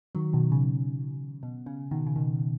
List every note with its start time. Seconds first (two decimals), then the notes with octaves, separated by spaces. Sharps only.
0.15 D#3 F#3
0.33 B2 D#3
0.52 C#3
1.43 B2
1.66 C#3
1.91 B2 D#3
2.07 C#3
2.16 B2 D#3